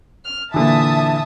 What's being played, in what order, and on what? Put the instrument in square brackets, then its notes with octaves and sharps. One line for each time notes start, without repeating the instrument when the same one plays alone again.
[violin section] F6
[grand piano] A#2 D3 E3 [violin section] E5 A5 D#6